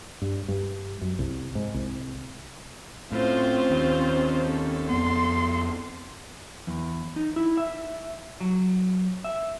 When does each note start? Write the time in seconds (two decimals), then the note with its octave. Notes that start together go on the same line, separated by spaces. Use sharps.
0.22 G2
0.48 G2
1.01 F#2
1.19 C2
1.55 G#2
1.74 C2
3.12 A2 C4 C#4 F4 C5
3.70 D#2
4.46 A4
4.90 F2 B3 C6
6.67 E2
7.16 D#4
7.36 E4
7.57 E5
8.40 F#3
9.24 E5